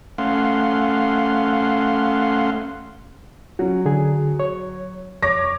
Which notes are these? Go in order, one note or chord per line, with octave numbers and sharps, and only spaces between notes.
A3 C#4 F5 F#5 C6
F#3 C#4 F#4
D3 G#4
C#5
F2 C#5 D6 A#6